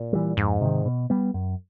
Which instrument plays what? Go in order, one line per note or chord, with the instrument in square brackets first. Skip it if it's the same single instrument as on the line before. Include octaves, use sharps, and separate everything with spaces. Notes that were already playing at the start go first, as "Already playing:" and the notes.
Already playing: [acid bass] A#2
[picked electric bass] E3 G3
[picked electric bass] F2 [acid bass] G#2
[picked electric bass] C3 D#3
B2
G3 B3
F#2